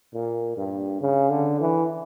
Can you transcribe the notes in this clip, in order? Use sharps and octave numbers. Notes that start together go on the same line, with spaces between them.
A#2
G2
C#3
D3
E3